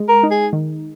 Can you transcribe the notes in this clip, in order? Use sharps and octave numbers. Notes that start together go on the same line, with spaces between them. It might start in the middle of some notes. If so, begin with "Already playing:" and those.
Already playing: G#3
A#4
D#4
G#4
D#3